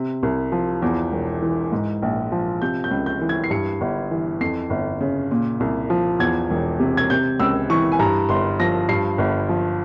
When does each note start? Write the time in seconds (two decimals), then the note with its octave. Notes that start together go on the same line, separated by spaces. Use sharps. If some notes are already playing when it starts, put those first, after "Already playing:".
Already playing: C3
0.23 C2
0.52 F3
0.82 E2
1.12 E1
1.42 E3
1.72 G#2
2.02 A#1
2.32 F3
2.62 C3 G6
2.84 G6
2.91 C#2
3.06 G6
3.21 E3
3.29 G#6
3.44 C7
3.51 G2 C#7
3.81 G1
4.11 E3
4.41 F2 C7
4.70 G1
5.01 C#3
5.31 A#2
5.60 C2
5.90 F3
6.19 E2 G#6
6.51 E1
6.80 C3
6.97 G#6
7.10 C3 G6
7.40 C#2 E6
7.70 E3 C#6
7.92 G#5
7.99 G2 A#5
8.29 G1 C6
8.59 F3 A#6
8.89 G2 C7
9.18 G1
9.49 F3